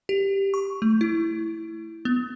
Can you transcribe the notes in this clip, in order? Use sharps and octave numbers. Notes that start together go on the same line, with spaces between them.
G4
C#6
A3
E4
B3